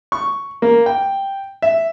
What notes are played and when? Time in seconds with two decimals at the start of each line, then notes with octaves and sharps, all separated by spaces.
0.12 C#6
0.62 A#3
0.86 G5
1.62 E5